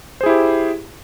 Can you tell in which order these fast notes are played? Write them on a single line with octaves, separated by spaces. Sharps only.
C5 G#4 E4 G4